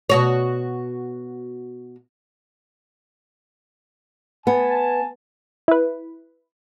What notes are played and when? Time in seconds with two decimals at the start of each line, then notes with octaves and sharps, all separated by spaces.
0.09 B2 F#4 C#5
4.47 B3 G#5 A5
5.68 E4 B4